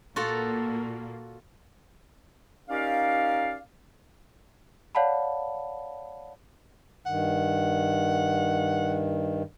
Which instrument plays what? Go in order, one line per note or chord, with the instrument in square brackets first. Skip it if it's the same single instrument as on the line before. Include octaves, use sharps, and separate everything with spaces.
[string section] A#2 A#3 [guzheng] F4 F#4 A4
[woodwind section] C#4 D#4 G4 A#4 D5 F5
[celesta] C#5 D5 F5 F#5 A5 B5
[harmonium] G2 D#3 [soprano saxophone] F#5